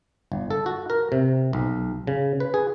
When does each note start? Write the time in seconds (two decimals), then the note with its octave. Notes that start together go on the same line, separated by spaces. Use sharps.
0.32 G1
0.51 A4
0.66 F#4
0.90 A#4
1.12 C3
1.53 B1
2.07 C#3
2.40 B4
2.54 G#4